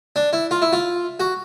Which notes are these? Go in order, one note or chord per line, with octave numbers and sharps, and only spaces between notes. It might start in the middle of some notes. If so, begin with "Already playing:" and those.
D4
E4
F4
E4
F4
F#4